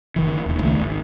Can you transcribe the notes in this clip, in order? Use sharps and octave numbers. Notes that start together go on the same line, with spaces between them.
F#1 D#3 E3
E1 D#2
C#2 D#3 A3
G#1